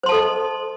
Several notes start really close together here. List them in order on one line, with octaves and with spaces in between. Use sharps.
C5 C6 A5 A4 D#5